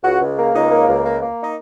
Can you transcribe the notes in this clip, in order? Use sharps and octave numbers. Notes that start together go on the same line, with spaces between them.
C#2 F#4
C#2
A#3
C#2 D#4
A#3
C#2
A#3
A#3
D#4